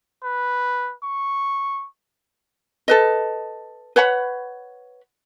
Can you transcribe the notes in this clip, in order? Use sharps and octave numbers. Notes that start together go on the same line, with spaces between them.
B4
C#6
A4 B4 D#5
B4 C#5 F#5 B5